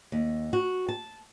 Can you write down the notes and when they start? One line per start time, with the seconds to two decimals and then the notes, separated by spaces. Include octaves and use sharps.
0.12 D#2
0.53 F#4
0.89 A5